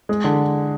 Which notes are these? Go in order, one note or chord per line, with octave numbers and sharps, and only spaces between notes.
G#3
D3